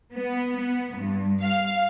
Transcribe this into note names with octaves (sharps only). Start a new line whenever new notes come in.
B3
B3
G2
F5